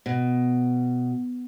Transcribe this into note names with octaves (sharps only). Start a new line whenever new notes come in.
B2